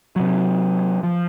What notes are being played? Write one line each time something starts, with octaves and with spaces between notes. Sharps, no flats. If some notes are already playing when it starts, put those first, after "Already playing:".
C3 F#3
F3